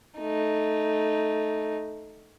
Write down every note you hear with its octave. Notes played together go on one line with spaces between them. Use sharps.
A3 D#4